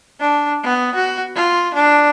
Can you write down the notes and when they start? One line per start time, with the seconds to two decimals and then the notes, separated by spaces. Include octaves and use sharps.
0.20 D4
0.63 B3
0.95 F#4
1.35 F4
1.74 D4